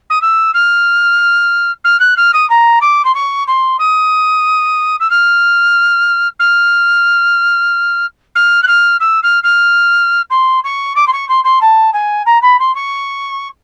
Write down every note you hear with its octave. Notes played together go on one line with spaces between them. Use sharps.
D#6
E6
F6
F6
F#6
F6
D#6
A#5
D6
C6
C#6
C6
D#6
E6
F6
F6
F6
F#6
F6
E6
F6
F6
C6
C#6
D6
C6
C#6
C6
C6
A5
G#5
A#5
B5
C6
C#6